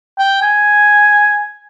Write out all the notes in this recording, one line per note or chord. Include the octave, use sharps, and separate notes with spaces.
G5
G#5